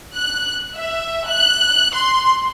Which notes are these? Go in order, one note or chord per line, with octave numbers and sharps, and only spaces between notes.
F#6
E5
F#6
C6